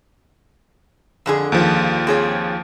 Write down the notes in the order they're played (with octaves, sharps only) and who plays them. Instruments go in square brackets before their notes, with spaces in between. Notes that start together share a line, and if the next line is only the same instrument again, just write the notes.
[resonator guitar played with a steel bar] F2 D3 G#4
[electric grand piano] D#2 F3
[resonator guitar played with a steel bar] C4 G#4 C#5